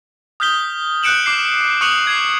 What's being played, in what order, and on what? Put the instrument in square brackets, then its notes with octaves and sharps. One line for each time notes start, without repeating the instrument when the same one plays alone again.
[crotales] D#6 F6 G6 B6 G7
F#6 G6 C#7 D7 E7 F#7
D6 C7
C#6 D#6 F#6 C#7 F7 F#7
G#6 C7